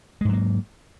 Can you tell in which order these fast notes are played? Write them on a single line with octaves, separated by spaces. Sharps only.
G#3 G#2 F#3 A#3